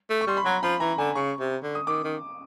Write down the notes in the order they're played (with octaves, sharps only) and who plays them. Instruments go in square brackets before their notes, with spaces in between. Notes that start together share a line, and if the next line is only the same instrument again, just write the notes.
[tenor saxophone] A3
[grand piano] C#6
[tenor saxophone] G3 [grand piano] C6
[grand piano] B5
[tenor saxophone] F#3 [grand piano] A#5
[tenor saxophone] F3 [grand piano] B5
[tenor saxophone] E3 [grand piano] A#5
[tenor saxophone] D3 [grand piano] G#5
[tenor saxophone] C#3 [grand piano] C#6
[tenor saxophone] C3
D3
[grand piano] D#6
[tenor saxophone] D#3 [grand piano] D6
[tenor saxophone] D#3